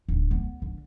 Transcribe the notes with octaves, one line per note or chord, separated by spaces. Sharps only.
D1
B3
D3